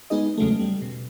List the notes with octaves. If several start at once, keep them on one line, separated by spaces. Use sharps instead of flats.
G#3 B3 D#4 G#4 D#5
E2 C#3 F#3 G#3 A3
G3
B2